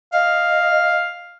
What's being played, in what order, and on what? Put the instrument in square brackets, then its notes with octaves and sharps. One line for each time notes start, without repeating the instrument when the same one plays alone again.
[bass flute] D#5 [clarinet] F5